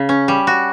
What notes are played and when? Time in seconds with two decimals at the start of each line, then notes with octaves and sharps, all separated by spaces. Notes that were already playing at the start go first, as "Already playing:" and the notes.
Already playing: C#3
0.09 C#4
0.28 G3
0.47 F#4